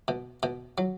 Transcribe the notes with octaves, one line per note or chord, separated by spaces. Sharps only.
B2
B2
F#3